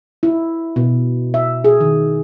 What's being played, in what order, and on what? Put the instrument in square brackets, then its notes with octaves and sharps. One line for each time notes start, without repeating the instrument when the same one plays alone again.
[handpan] E4
B2
E5
G#4
D#3